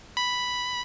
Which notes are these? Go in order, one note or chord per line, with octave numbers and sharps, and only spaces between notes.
B5